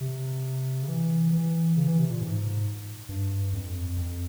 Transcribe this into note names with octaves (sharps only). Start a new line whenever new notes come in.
C3
C#3
E3
E3
C#3
E3
C3
A#2
G#2
G2
F2
F2